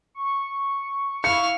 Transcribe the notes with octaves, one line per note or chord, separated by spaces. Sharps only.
C#6
E4 F5 C#7